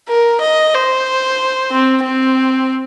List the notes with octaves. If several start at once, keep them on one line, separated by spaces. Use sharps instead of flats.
A#4
D#5
C5
C4
C4